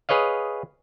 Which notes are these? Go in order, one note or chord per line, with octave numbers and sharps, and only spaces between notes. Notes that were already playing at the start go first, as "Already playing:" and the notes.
G#4 B4 C#5 D#5 F5